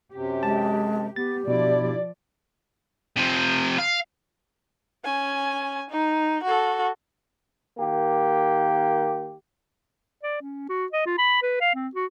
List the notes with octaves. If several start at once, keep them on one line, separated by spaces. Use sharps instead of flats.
F#2 C3 G4
G#3 A5
B3 G4 A6
B2 F3 D4 E4 D5
C3 F3
F5
C#4 G#5
D#4
F#4 A4
D#3 A#3 G4
D5
C#4
F#4
D#5
F4
B5
B4
F5
C4
F#4